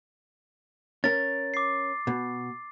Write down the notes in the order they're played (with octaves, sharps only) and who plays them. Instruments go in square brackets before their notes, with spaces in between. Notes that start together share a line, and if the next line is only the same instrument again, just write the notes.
[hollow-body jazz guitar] C#4 A#4 [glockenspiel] A6
[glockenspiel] D6 C7
[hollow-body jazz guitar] B2